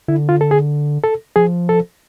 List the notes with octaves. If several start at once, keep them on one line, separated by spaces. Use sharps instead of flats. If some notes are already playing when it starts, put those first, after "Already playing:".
D3 E4
F4
A4
G#4
A4
F3 G#4
A4